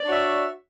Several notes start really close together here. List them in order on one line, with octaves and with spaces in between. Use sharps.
D5 D4 C#5 F#4 E5